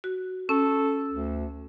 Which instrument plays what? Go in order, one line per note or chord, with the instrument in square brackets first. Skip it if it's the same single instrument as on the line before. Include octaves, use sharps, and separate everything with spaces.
[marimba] F#4
[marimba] C#4 [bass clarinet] A4
[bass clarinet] D2